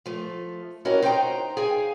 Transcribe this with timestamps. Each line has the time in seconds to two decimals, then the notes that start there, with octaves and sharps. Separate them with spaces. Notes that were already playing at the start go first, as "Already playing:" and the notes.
0.06 F3 A3
0.85 C#4 E4 F#4 G4 A#4 D#5
1.02 D#4 C5 D5 F#5 G5 A#5
1.57 G#4 F5 G5 G#5